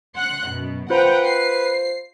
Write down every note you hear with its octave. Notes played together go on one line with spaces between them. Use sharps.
F#5 C6 F#6
F#2 B2
F4 B4 C5 F#5 G5 A#5
C7